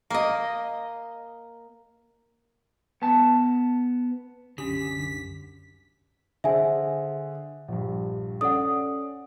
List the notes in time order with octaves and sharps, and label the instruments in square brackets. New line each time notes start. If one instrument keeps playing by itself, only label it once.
[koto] A#3 D#5
[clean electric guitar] B3 A5
[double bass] C2 F#2 [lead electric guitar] D3 [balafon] C#4 G4 [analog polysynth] B6
[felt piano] D3 G#4 C5 [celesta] E5 G#5
[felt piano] A#1 G2
[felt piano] C#4 A4 D5 [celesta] F#5 D#6